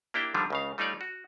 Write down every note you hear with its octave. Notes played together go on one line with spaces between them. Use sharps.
A#3 D4 E4 G4 G5
D3 D#3 F3 G3 D4 F4
C#2 C#3 F5
G3 A3 D#4 F4 C#5 D5
F#4